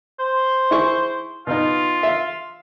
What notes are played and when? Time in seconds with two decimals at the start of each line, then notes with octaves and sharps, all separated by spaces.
0.19 C5
0.71 E4 G#4 C#6
1.47 B2 D#4 F4
2.03 E5 F5